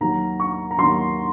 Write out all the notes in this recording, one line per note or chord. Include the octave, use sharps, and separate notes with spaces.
D#2 D#3 F#3 A#5
C#6
A#5
D#2 D#3 F#3 C6